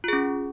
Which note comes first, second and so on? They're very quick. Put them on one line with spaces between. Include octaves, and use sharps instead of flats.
F4 G#4 C#4